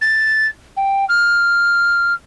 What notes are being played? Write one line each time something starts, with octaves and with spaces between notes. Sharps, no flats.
A6
G5
F6